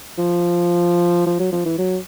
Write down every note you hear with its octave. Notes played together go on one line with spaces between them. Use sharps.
F3
F3
F#3
F3
E3
F#3